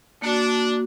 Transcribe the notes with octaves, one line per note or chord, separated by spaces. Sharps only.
A#3 D4 F#4